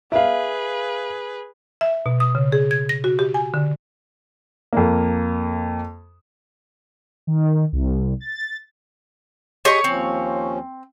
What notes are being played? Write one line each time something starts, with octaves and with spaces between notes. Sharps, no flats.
G#4 B4 E5 F5
E5
B2
D#6
C#3
G#4
G#6
A#6
F#4
G4
G#5
D3
F2 A#3
D#3
C2
A6
G4 G#4 C#5 D#5 C#6
D#2 F3 C4 C#4